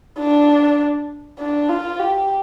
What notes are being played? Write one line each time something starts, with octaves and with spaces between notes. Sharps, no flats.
D4
D4
F4
G4